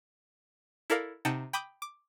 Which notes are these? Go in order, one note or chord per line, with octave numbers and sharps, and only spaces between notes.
E4 A4 A#4 D5 F5
C3 D#4 F#5 G5 A5
G5 B5 D6 D#6 G6
D6